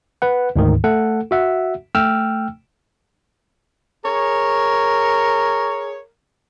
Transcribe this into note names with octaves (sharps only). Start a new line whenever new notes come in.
B4 F#5
D2 G#2 D#3
A3 A4 F#5
F#4 E5 F#5
A3 G5 E6 F6
G#4 A#4 C#5